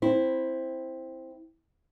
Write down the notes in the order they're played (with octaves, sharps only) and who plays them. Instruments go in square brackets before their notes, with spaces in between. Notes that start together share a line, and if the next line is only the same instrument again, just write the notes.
[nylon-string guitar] C4 E4